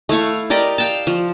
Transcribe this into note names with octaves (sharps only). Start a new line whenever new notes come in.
A3 E4 F5 C#6
G4 A#4 D5 D#5
F5 G5 A5
F3